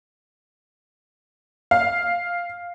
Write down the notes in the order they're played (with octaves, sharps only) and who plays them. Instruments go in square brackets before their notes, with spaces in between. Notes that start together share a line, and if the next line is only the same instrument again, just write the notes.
[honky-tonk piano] F5